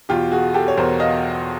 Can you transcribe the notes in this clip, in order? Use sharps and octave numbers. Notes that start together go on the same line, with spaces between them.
E2 B2 F4 G4
F#4 G#4
G4 A4
C#5
E2 B2 A#4 C5
D#5 F5